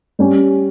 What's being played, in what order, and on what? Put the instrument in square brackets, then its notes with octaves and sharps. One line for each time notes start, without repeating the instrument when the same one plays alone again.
[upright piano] G3 C#4 G4